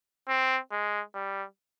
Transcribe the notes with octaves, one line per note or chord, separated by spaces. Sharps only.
C4
G#3
G3